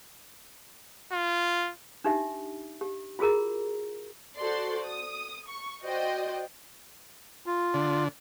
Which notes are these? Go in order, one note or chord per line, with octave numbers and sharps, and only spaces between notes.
F4
D4 D#4 G4 E5
G4
F4 F#4 G#4 A#4 A#5
F#4 A4 C5 D5 C6
D#6
C#6
F#4 C5 D5 D#5 G5
F4
D3